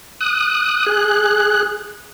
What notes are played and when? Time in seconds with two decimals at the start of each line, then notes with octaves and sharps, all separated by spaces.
0.21 D#6 F#6
0.86 G#4 F#6